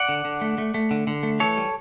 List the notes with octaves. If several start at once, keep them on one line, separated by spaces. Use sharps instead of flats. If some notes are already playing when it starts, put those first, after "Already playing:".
Already playing: D5 F#5
D3
D3
A3
A3
A3
D3
D3
A3
E3 A4 C#5
G3